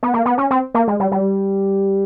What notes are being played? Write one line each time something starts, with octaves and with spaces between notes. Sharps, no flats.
B3
A#3
B3
C#4
C4
A#3
G#3
G3
G3